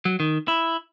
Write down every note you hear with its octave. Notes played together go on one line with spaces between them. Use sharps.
F#3
D#3
E4